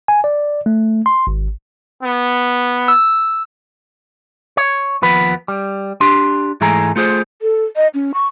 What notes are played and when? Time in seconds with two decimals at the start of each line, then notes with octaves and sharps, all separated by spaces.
0.08 G#5
0.24 D5
0.66 A3
1.06 C6
1.27 G#1
2.03 B3
2.88 E6
4.57 C#5
5.02 D#2 F3 B3 B4
5.48 G3
6.01 D4 G4 C6
6.61 G#2 E3 G#3 A3 G#4 A#5
6.96 A3 F4 G#4 C5
7.42 A4
7.76 D#5
7.94 C#4
8.14 C#6